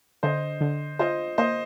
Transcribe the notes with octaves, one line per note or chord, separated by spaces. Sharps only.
D3 C5 D#5
D3
F4 C5 D#5
A#3 C5 D#5